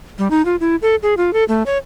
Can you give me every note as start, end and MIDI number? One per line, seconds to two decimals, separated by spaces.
0.18 0.28 55
0.31 0.44 63
0.45 0.56 65
0.60 0.76 64
0.82 0.96 69
1.03 1.14 68
1.17 1.33 65
1.33 1.44 69
1.48 1.63 57
1.66 1.78 73